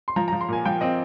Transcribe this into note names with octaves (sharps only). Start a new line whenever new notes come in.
C6
F3 A#5
A#5
F3
C6
A#2 G#5
F3 G5
C4 D#5